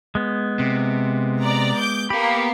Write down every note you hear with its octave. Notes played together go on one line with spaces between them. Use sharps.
G#3 B3
C3
D5 A#5
D6 G6
A#3 B3 G4 B5